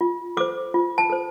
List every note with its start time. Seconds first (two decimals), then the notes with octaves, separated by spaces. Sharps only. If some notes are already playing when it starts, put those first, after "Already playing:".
0.01 F4
0.37 A4 C5 D6
0.74 F4
0.98 A5
1.10 A4 C5